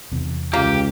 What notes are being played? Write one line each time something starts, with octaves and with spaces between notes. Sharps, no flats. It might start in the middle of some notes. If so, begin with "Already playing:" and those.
E2 C3
C#2 A#3 G4